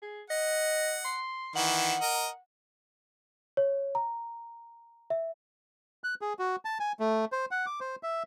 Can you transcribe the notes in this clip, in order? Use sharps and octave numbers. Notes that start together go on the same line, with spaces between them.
G#4
D#5 F#5
C6
D#3 E3 F#5
A#4 D#5
C#5
A#5
E5
F#6
G#4
F#4
A5
G#5
A3
C5
F#5
D6
C5
E5